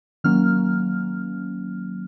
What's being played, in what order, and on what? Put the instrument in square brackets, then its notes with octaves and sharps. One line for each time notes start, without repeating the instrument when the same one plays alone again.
[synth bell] D#3 F#3 A#3 C#4 F6